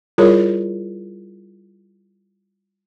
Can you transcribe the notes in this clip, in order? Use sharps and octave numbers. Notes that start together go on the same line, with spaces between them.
G3 E4 F4 G#4 A#4 C#5